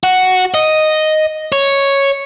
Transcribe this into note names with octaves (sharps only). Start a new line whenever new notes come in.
F#4
D#5
C#5